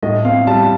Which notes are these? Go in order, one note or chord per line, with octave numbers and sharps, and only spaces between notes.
A2 D#5
C4 F5
G3 A5